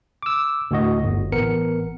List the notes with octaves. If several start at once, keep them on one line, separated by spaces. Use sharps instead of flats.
D6 E6
D2 A2 F#4 D#5
G1
A1 B3 A#4 C#7